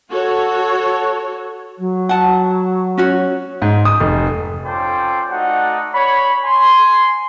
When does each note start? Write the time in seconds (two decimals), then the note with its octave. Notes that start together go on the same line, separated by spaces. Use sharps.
0.10 F#4 A4 C#5
1.79 F#3
2.09 F#5 A5
2.98 C#4 F#4 C#5
3.62 G#2
3.85 D#6
4.00 F1
4.65 C#4 F4 A4 C5 D5 G5
5.30 A3 D#4 F#4 D5 F#5
5.94 C#5 B5
6.44 G#5 C6